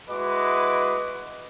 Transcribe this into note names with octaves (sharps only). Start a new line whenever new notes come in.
G#3 E4 F#4 B4 D#5 D6